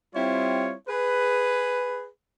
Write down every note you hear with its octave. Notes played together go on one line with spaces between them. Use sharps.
G3 C4 E4 F4 C#5
G#4 B4